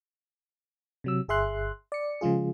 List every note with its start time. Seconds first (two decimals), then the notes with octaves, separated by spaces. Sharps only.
1.04 C3 F#3 E6
1.28 G1 G#4 E5 C6 F#6
1.92 D5 C#7
2.21 C#3 F3 G#3 F4 G#4